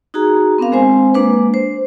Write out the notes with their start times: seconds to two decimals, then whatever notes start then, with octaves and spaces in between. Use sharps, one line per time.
0.14 D#4 F#4 G#4 A#5
0.58 B3 C4 D4 A#4 F5
0.72 G#3 C4 C5 G#5
1.15 G#3 A#3 D4 B4
1.54 C5